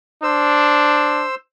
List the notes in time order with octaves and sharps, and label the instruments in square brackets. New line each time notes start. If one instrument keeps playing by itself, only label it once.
[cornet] D4 [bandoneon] C5 E6